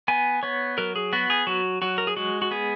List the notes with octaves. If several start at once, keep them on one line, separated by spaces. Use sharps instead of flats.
B3 G#5
B3 C#5
F#3 A#4
G#4
B3 F#4
G#4
F#3 F#4
F#3 F#4
A#4
G#4
G#3 F#4
F#4
B3 G#4